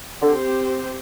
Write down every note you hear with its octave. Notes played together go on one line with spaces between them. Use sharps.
D3 C4 G4 C5